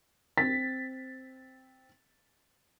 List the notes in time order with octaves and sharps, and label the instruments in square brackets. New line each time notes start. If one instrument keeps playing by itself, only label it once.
[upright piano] C4 A6 B6